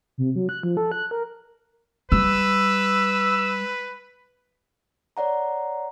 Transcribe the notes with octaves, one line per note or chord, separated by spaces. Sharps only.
C3
F#3
F#6
F3
A4
F#6
A#4
G3 B4 E6
C#5 D5 F#5 A#5